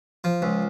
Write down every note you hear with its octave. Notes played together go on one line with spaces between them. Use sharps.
F3
C#2